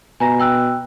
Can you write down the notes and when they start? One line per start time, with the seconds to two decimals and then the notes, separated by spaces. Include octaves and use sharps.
0.20 B2 G#5 A#5 A#6
0.40 G5 E6 F#6